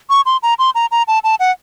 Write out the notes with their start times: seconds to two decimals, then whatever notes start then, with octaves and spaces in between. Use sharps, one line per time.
0.10 C#6
0.26 C6
0.43 A#5
0.59 C6
0.75 A#5
0.91 A#5
1.08 A5
1.24 A5
1.40 F#5